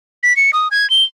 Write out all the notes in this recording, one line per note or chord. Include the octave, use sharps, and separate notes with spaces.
B6
C#7
D#6
G#6
G7